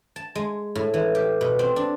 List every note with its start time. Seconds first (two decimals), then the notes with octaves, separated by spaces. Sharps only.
0.16 A5
0.35 G#3
0.75 A2
0.94 E3
1.15 G4
1.41 B2
1.59 C4
1.76 D4